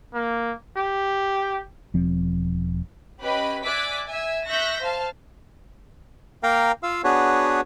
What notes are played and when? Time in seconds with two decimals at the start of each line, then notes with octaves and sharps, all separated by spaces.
0.15 A#3
0.77 G4
1.94 E1 F3 C4
3.21 C#4 G4 B4 D#5 B5
3.64 D5 E5 G#5 D6 F#6 B6
4.06 E5 G#5
4.48 E5 C#6 F#6 G6 A#6 B6
4.81 C5 F5 A5
6.43 A#3 A#4 F5 G5 A#5
6.83 F4 F5 E6
7.04 B3 D4 F#4 G#4 B4 C#5